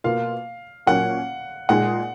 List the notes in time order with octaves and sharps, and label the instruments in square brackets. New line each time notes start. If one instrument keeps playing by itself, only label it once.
[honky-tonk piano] B2 A#3 F4 [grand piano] F5
[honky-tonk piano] A#2 F#3 A#3 C#4 [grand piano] F#5
[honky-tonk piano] A#2 G#3 D#4 G#4 [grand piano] F#5